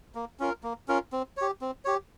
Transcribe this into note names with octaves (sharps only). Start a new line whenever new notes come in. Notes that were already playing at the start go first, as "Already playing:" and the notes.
A#3
C#4 F4 A#4
A#3
C#4 F4 A#4
C4
G4 C#5
C4
G4 C#5